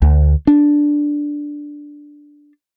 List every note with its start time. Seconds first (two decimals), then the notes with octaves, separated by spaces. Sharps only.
0.02 D2
0.47 D4